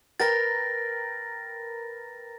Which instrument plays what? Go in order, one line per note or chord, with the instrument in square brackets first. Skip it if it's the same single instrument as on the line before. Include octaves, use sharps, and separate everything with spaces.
[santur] A#4 B4 G5 [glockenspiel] A6 A#6